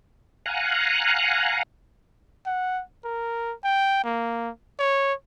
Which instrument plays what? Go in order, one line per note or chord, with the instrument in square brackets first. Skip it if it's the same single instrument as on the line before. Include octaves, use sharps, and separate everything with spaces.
[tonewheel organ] F5 F#5 G#5 A#5 F#6
[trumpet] F#5
A#4
G5
A#3
C#5